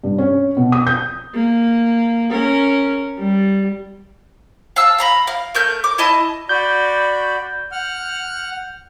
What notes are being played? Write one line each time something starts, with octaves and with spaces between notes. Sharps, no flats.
G2
C#4
B2
D#6
G6
A#3
C#4 A#4
G3
F5 A5 E6
F5 A#5 B5
F5
A3 A#4 G6
D6
E4 D#5 A5
F#4 D5 B5 G6
F#5 F6